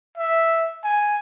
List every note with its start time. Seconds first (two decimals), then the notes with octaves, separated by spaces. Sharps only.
0.18 E5
0.84 G#5